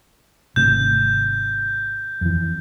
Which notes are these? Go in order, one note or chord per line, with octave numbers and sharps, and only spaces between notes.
G#1 C3 A3 G6
F2 E3